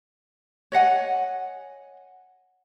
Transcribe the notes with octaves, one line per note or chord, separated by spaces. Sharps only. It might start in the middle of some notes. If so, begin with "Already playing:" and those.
C#5 D#5 F#5 G#5